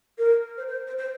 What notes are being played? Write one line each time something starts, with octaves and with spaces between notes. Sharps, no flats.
A#4
C5
C5
C5
C5